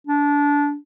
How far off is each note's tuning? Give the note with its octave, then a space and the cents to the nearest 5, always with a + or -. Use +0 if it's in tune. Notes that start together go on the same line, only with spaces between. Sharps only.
D4 -20